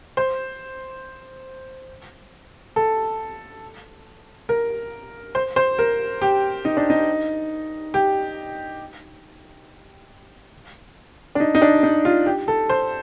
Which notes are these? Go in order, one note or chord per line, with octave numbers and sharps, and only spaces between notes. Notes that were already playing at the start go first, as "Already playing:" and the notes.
C5
A4
A#4
C5
C5
A#4
G4
D#4
D4
D#4
G4
D4
D#4
D#4
D4
D#4
F4
G4
A4
C5